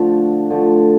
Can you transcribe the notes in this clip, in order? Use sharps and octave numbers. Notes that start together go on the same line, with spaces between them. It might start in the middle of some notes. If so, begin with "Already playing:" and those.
Already playing: D3 F3 A3
D3 F3 A3